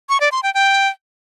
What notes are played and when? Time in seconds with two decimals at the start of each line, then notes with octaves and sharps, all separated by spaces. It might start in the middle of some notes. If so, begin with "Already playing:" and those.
0.09 C#6
0.20 D5
0.32 C6
0.43 G5
0.54 G5